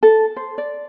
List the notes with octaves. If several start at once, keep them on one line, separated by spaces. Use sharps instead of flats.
A4
C5
D5